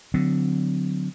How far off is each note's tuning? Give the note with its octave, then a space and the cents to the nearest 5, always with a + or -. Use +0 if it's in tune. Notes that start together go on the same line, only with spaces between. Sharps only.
D3 +0 F#3 -20 C4 -45